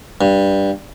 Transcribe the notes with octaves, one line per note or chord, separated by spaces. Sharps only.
G2